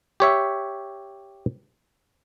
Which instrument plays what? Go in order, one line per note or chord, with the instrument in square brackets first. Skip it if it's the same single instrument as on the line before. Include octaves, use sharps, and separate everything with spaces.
[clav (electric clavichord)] G4 C#5 E5